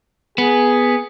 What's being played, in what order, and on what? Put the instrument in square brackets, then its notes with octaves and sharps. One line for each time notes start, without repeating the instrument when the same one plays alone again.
[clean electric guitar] B3 [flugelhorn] G#4